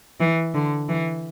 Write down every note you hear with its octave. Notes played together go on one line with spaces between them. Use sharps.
E3
D3
E3